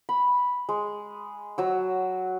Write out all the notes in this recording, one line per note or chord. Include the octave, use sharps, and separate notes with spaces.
B5
G#3
F#3 E6